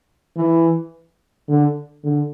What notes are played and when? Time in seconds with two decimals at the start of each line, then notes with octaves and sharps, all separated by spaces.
0.36 E3
1.48 D3
2.04 D3